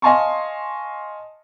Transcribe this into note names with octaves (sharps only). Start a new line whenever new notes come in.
D#5 F5 G#5 A5 C6 C#6